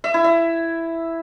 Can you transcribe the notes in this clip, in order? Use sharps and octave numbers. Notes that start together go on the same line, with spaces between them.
E5
E4
E5